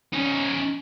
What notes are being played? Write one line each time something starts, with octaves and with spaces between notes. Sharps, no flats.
C#4 D#4